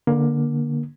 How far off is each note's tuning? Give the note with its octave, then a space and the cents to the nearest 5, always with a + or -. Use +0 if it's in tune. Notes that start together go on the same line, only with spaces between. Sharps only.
D3 +0 A#3 +20